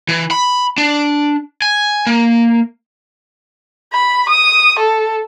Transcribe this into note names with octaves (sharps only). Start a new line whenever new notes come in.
E3
B5
D4
G#5
A#3
B5
D#6
A4